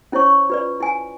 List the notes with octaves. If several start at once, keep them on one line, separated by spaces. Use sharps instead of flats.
C#4 E4 C5 C#5 C#6
C#6
F4 B4 D5
E4 G#5